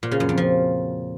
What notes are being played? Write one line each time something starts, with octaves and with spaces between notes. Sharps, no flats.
A#2
C#3
F#2
F2
F3